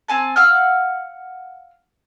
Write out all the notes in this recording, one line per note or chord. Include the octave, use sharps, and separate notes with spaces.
C4 G#5 A5
F5 F#5 E6 F6